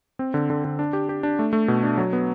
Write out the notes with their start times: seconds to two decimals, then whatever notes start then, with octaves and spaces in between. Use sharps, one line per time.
0.19 C4
0.34 D3
0.50 D3
0.65 D3
0.79 D4
0.93 G4
1.09 G4
1.23 D4
1.39 A3
1.53 A3
1.68 B2
1.83 D4
1.98 F#3
2.13 B3